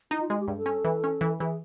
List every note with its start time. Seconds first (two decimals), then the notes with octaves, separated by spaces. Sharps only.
0.11 D#4 E4
0.20 F4
0.30 G#3 F#4
0.39 G4
0.48 G2 G#4
0.57 A4
0.66 C#4
0.85 E3
1.04 C#4
1.21 E3
1.40 E3 G#4